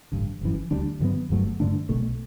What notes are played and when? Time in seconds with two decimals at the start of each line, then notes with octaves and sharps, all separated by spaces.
0.12 A1 G2 D3
0.41 G1 F#2 E3
0.71 D2 D3 G3 D4
1.00 G2 D3 F#3 B3
1.30 G1 G2 F#3 A3
1.60 G2 D3 A3 D4
1.89 B1 B2 A3